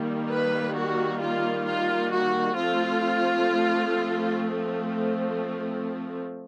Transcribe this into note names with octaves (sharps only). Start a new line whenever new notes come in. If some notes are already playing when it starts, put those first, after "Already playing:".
Already playing: D#3 G3 A#3
B4
F#4
F4
F4
F#4
F3 A3 C4 F4